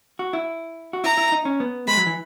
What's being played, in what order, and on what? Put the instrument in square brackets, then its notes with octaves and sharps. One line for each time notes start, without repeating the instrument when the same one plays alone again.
[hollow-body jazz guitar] F#4
E4
F#4
[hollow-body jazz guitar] E4 [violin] A#5
[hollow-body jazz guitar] E4
D#4
C#4
B3
[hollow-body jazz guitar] G#3 [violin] B5
[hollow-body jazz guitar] F#3
E3